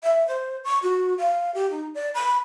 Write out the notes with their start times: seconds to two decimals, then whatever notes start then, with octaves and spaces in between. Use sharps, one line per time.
0.03 E5
0.28 C5
0.64 C#6
0.83 F#4
1.18 F5
1.54 G4
1.70 D#4
1.95 D5
2.14 B5